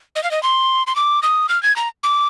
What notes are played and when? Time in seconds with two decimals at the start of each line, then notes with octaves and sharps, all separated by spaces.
0.16 D#5
0.23 F5
0.31 D#5
0.43 C6
0.87 C6
0.96 D6
1.23 D#6
1.49 F6
1.63 G#6
1.76 A#5
2.03 D6